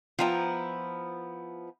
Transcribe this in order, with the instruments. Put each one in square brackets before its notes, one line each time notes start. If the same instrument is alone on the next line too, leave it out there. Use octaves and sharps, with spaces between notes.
[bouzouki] F3 B3 E4 [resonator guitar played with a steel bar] F4 G5 A#5